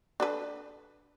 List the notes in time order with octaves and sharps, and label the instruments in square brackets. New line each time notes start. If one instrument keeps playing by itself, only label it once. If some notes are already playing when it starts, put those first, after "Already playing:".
[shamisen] D4 A4 B4